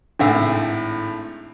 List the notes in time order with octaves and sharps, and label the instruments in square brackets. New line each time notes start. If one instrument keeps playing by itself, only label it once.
[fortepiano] G#1 A2 E6 [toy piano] D4 F#5